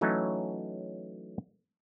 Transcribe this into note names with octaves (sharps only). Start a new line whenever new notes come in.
E3 F#3 A3 C#4 D#4